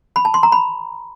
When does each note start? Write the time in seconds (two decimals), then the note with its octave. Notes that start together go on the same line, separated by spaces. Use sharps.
0.16 B5
0.25 A5
0.34 C6
0.43 A#5
0.52 B5